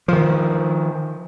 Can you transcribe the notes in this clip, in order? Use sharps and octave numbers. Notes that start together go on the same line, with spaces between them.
D#3 F3